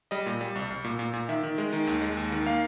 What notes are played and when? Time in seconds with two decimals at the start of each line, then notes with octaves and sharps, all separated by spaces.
0.11 G3 D#5
0.26 A#2
0.41 G3
0.55 C2
0.70 C2
0.84 A#2
0.99 A#2
1.13 A#2
1.29 D#3 E5
1.43 D#3
1.58 G#3
1.73 D#3
1.87 D#2
2.02 G#3
2.17 D#2
2.32 D#3
2.46 A#3 F5